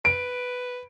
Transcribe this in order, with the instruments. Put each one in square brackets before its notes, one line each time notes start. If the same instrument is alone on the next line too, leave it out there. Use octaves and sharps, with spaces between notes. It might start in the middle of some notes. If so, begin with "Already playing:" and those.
[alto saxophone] B4 [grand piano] D7